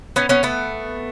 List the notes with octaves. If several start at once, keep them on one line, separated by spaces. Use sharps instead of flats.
B3 C#4
B3 C#4
A3 B3